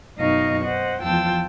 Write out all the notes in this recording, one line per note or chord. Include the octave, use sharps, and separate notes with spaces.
F#2 B2 D#4 D#5 F5 C#6
C5 D#5 F#5
E2 F3 F4 G5 A5 E6